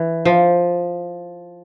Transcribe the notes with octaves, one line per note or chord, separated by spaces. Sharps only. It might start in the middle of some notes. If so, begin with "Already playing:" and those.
Already playing: E3
F3